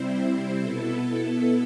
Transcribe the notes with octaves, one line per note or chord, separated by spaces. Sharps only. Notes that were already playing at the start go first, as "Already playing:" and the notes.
Already playing: C3 G3 C4 E4 C5
B2 B3 E4 A4